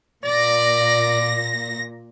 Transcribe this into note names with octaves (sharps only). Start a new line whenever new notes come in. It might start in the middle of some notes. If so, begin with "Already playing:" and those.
A#2 D5 A#6